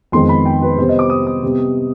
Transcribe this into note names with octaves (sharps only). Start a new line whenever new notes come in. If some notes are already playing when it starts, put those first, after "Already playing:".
F2 D#3 G#3 B3 C6
B5
G5
B4
C3 G3 B3 C5
D#5
D6
D#6
D#6
C3 G3 B3